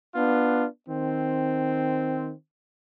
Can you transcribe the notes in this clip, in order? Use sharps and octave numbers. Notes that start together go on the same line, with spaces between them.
B3 D4 F4
D#3 C4